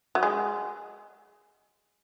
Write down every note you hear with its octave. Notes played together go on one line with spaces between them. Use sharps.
F#3
G#3